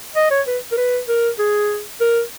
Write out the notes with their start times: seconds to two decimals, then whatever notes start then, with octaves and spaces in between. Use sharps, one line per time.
0.15 D#5
0.31 C#5
0.47 B4
0.72 A#4
0.78 B4
1.08 A#4
1.39 G#4
2.00 A#4